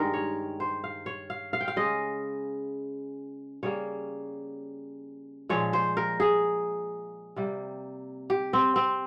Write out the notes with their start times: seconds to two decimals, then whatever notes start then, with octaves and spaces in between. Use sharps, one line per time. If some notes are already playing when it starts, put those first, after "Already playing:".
Already playing: G2 D#3 G#3 A#4
0.14 C#5
0.60 C5
0.84 F5
1.06 C#5
1.30 F5
1.53 F5
1.61 G5
1.68 F5
1.76 C#3 G#3 D#5
3.63 C#3 G3 A#3 C#5
5.49 A#2 F3 G#3 C#5
5.73 C5
5.97 A#4
6.20 G#4
7.36 C3 G3 A#3
8.30 G4
8.53 C4
8.76 C4